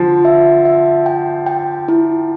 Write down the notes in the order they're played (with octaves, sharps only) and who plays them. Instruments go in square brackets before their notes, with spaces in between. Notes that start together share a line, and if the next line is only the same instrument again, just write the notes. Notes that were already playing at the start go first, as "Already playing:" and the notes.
Already playing: [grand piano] D3 F3
[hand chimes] E5
E5
G5
G5
E4